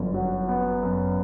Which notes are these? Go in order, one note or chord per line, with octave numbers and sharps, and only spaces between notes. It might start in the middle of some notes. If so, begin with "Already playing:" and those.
Already playing: G1 F#2
F#3
B3
F#2